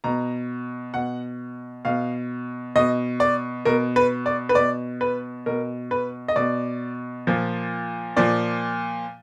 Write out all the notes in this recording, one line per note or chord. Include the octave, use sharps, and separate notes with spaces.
B2 A#5
B2 F#5
B2 F5
B2 D#5
D5
B2 A#4
B4
D5
B4
B2 D5
B4
B2 A#4
B4
D#5
B2 D5
A#2 F3
A#2 F3 D5